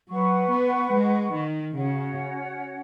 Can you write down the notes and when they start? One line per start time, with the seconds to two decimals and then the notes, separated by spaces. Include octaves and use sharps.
0.11 F#3 B4 F#5 C#6
0.52 B3
0.93 G#3
1.35 D#3
1.76 C#3 C#4 F#4 C#5 F#5